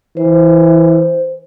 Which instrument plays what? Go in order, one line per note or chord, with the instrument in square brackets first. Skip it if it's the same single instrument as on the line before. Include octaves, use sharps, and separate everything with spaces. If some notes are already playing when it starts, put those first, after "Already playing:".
[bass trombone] E3 [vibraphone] C5